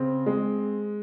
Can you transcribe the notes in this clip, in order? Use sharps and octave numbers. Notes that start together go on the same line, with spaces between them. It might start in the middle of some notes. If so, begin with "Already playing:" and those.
Already playing: C#3 C4
G#3